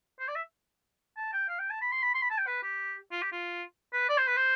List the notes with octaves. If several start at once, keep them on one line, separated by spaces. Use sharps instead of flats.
C5
D5
E5
A5
G5
F5
G5
A5
B5
C6
B5
C6
B5
A5
G5
B4
G4
F4
G4
F4
B4
D5
C5
B4
C5